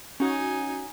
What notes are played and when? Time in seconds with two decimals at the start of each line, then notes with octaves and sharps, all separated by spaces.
0.20 C#4 D#4 F#4 G#5